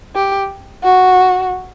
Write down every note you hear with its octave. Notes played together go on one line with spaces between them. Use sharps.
G4
F#4